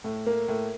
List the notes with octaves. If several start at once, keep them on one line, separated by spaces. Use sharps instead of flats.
A2
A#3
A2